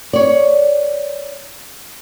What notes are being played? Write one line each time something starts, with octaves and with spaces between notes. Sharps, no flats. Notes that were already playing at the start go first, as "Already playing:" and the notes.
C#5 D5